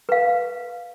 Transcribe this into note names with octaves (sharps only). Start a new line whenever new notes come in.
B4 F5